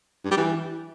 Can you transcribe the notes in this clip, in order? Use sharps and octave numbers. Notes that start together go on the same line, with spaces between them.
G2
G3
E3